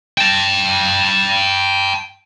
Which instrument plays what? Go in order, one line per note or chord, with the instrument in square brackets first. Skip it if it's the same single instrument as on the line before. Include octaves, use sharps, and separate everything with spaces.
[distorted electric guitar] G5 A5